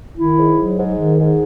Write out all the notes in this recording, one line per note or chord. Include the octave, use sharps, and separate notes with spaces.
D#3 E4
G#2
F#3
G#2
D#3
G#2